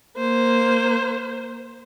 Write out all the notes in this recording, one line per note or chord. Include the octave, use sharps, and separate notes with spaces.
A#3 C5